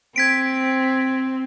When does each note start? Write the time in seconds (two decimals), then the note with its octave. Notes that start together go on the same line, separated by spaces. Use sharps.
0.16 C4 G#6 B6 D7